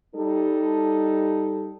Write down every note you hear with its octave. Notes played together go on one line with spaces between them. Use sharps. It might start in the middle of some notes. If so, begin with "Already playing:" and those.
G3 D#4 A4